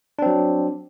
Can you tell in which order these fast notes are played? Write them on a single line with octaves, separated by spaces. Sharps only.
D4 C4 F#3